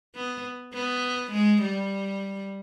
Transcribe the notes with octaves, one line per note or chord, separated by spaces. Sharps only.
B3
B3
G#3
G3